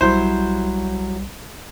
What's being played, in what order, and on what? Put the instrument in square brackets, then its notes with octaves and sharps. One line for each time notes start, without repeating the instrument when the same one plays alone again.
[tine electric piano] B1 G3 [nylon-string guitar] F#3 E4 [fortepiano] C5